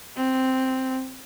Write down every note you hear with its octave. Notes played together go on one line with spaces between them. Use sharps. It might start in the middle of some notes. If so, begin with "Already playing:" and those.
C4